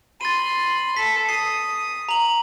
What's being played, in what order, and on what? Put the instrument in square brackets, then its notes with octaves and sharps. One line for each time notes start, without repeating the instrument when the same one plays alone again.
[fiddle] B5 C6 [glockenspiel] A6 D#7
[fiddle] A4 [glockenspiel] B6
[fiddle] D#6 [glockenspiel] C7
[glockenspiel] A#5 F#7